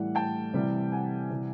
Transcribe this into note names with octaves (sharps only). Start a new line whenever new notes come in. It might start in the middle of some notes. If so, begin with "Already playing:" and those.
Already playing: A2 E3 G3 F#5
G5 A5
C3 E3 G3
F#5 G#5
C3 E3 G3